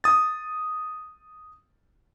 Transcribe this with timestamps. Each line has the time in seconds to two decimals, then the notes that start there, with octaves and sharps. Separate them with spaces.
0.04 D#6 A6